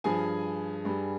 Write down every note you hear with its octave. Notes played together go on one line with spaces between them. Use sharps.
G2 F3 G#4 G#5
G2 G3